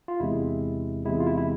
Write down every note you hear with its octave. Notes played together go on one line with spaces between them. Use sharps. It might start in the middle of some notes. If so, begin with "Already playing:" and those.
F4
E2 C3 G#3 E4
E2 C3 G#3 E4
F4
E4
E4